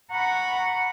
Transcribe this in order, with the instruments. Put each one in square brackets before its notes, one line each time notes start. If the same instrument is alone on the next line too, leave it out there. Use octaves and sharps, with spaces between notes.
[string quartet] F#5 A#5 B5 C#6